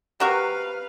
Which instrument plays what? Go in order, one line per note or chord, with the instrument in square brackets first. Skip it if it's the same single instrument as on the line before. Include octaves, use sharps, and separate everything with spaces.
[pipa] C3 F#4 A#4 [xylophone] G4 C#6 D#6 [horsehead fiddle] B4 F5